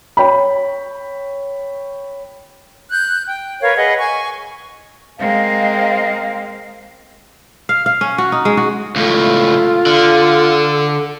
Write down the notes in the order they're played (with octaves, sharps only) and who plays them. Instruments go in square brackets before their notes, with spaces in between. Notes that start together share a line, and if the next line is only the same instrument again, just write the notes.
[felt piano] C#5 G5 B5
[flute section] F#6 G6
G5
A#4 B4 C#5 F5
G#4 B4 D#5 F#5
G#5 C#6
[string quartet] G#3 A#3 C4 [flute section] D#5 F5
[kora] F5
F5
C#4
F#4
D#4
G#3
F#4
[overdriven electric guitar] C#2 A2 [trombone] F4 [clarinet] A4
[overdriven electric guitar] D3